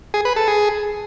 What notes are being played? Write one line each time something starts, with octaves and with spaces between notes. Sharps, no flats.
G#4
B4
A4
G#4